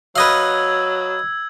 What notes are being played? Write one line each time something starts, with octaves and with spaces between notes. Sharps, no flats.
F#3 B4 D#5 F5 E6 G#6